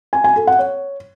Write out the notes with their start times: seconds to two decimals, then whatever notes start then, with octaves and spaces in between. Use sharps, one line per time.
0.13 G#5
0.24 G#5
0.36 A4
0.47 F#5
0.59 C#5